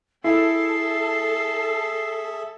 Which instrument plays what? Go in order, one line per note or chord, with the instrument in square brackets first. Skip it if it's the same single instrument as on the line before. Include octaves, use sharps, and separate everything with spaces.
[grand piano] E4 [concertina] G#4 E5 [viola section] A4 [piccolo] C7